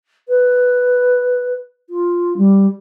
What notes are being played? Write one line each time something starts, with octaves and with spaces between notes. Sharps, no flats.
B4
F4
G3